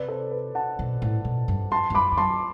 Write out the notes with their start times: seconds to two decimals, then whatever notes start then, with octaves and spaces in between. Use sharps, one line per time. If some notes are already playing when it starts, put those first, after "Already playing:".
Already playing: C3 B4 D5
0.08 A4 C5
0.32 B4
0.55 F#5 A5
0.79 B2
1.02 A2
1.25 B2
1.48 G2
1.71 F#2 A5 C6
1.90 G2
1.95 F#2 B5 D6
2.12 E2
2.17 F#2 A5 C6